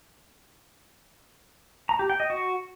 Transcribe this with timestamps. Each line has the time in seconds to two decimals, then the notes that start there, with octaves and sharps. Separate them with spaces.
1.89 A#5
1.99 G4
2.10 G5
2.20 D#5
2.30 F#4